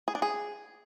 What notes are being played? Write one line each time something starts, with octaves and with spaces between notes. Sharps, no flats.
G#4
D4
G#4